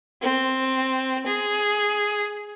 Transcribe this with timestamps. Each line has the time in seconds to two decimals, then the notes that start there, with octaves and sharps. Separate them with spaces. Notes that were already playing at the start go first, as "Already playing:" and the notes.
0.22 C4
1.26 G#4